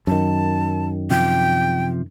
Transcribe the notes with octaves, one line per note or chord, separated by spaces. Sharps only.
F#2 D#3 A5
C3 F3 G5